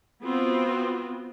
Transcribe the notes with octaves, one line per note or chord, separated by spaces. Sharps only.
B3 C4 F4 F#4